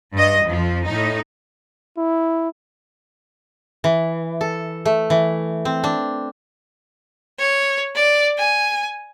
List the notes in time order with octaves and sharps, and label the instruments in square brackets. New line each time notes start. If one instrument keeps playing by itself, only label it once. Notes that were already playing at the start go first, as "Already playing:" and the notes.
[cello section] G2 D#5
F2 F3
A2 D#4
[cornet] E4
[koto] E3
A4
A3
E3
C4
D4
[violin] C#5
D5
G#5